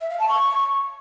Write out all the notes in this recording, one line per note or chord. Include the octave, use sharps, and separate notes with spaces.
E5
F5
A5
C#6